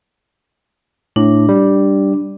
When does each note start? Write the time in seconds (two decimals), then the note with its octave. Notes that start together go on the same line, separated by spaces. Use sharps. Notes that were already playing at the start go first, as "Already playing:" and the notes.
1.16 A2 D4
1.49 G3